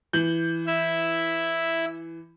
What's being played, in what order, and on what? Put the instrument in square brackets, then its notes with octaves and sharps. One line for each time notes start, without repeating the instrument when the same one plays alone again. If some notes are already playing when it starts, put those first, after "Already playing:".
[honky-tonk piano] E3 G6 F#7
[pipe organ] E4 E5